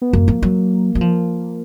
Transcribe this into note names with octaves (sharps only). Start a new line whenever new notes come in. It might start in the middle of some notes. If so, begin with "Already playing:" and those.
B3
F#2 A#3
F3
F#3
F#3
F3